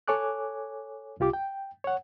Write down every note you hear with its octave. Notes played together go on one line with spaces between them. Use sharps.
A4 C#5 G#5 D6 F#6
C2 F4 G4 D6
G5
C#5 F#5